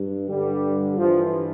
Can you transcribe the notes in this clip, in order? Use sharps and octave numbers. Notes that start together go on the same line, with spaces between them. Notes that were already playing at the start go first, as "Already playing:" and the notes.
Already playing: G2
G2 D3 G3
G2 E3 F3